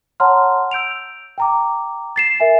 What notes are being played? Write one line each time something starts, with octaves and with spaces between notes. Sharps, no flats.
C#5 F#5 A5 A#5 C6 F6
E6 G6 D7 F7
G5 A#5 D6
A6 C7 E7
A#4 E5 G#5